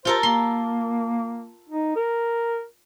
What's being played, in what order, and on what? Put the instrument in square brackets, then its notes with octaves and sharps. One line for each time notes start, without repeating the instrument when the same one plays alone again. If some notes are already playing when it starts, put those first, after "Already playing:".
[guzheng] F4 A4 A#4 [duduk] C5
[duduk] A#3 [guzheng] C6
[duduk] D#4
A#4